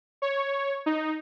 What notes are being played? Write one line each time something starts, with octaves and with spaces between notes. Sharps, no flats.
C#5
D#4